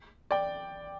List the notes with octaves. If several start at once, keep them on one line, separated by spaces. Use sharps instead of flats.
D5 G5